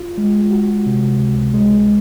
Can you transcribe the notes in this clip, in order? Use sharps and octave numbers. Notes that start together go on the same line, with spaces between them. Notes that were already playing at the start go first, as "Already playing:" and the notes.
Already playing: F4
G#3
F#4
C3
C#2
G#3